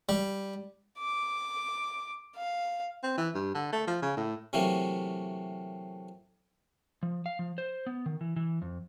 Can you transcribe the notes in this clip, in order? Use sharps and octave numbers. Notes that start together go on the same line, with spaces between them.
G3
D6
F5
C4
E3
G2
D3
A3
F3
C#3
A2
C3 E3 F#3 A3 A#3
F3
F5
F3
C5
B3
D#3
E3
E3
F2